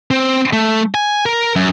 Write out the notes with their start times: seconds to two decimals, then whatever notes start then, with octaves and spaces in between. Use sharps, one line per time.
0.11 C4
0.53 A3
0.95 G#5
1.26 A#4
1.56 F#2